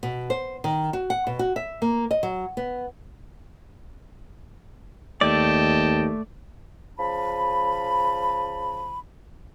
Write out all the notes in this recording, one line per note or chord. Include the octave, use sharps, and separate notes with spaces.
B2
C5
D#3
F#4
F#5
B2
F#4
E5
A#3
D#5
F#3
B3
D#2 A3 D5 D#5 G5 A5
C#3 F3 A5 B5